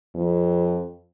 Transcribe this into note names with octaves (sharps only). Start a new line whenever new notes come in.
F2